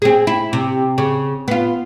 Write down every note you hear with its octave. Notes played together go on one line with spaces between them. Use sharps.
C4 G#4
E4
C3
C#3
B3 F4